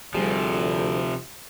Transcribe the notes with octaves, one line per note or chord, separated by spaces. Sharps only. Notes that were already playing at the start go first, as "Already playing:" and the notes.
D2 C3 F3 G3 G#4